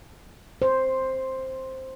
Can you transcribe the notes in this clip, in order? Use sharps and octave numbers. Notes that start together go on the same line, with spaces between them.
C5